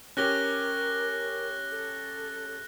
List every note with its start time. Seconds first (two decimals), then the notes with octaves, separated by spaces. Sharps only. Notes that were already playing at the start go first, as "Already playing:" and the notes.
0.17 C#4 G4 A#4 F#6 A#6 G7
1.72 A4